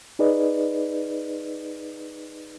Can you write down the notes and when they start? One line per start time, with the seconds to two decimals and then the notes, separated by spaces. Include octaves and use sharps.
0.19 D#4 G#4 B4 D5 D#5